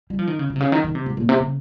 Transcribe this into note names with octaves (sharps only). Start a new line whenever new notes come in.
G3
F3
D#3
C#3
C#3
C3
C#3
D#3
D#3
C3
G#2
A#2
C3
C#3